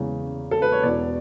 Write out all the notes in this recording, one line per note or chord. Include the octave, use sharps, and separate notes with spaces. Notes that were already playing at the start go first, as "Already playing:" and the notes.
Already playing: E2 C#3 G#3
A4
B4
C#5
E1 E2 B2 D5